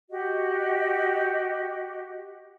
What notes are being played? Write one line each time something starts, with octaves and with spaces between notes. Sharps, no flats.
F#4 G4 D#5